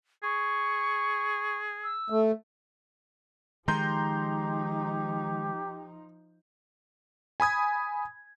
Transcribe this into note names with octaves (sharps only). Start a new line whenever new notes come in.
G#4 C#6
E6
A3
D#3 F3 G#3 D#4 G4 A#5 C6 G6
G#5 B5 D#6 G#6